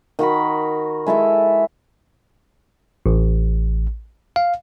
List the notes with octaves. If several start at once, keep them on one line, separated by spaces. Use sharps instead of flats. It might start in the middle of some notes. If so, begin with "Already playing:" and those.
D#3 F#4 A#4 B5
G#3 E4 A4 E5
A1
F5